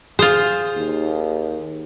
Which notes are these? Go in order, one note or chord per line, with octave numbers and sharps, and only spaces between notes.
F4 G#4 C5
D#2